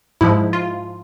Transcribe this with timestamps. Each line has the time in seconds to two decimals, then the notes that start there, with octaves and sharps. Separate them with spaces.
0.21 G#2 F3 G#3 E4
0.53 F4